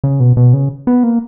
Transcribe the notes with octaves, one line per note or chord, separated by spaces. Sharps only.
C#3
B2
B2
C#3
B3
A#3